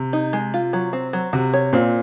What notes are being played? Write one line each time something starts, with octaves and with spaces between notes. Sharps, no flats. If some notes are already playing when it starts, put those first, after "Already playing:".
Already playing: C3
D#4
G#3
F4
F#3
C4
F#3
C3 F#4
C#5
A#2 C4